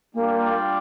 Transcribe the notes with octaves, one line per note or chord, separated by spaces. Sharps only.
G3 A#3 D4 F4 D5 G5